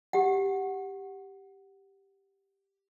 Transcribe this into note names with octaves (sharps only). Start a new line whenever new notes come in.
G4 F#5